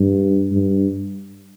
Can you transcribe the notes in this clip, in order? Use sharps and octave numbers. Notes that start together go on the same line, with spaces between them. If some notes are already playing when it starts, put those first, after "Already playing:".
Already playing: G2
G2